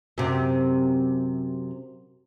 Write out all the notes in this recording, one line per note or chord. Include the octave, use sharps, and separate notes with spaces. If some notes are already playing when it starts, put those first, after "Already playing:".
F#2 C3